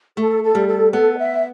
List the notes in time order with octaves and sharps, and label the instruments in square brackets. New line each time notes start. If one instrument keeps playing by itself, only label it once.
[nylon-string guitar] A3 [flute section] A4
[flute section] A4
[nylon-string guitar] G3
[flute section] A4
[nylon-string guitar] B3 [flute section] A4
[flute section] E5